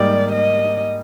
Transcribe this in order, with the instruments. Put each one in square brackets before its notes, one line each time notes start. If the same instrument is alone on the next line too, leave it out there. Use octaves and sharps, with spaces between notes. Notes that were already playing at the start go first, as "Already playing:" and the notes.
Already playing: [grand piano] G#2 G3 A#3 D#4 G4 [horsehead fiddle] D5
[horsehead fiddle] D#5